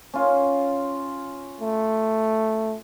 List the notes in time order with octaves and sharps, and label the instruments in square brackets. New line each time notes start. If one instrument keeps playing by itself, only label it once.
[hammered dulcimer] C#4 F4
[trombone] A3